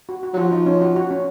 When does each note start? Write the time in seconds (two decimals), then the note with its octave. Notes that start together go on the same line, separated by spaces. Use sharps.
0.09 F#4
0.23 F#4
0.33 F#3
0.37 F3 F#4
0.52 D#4
0.66 C#4
0.82 F#4
0.96 F#4
1.11 C#4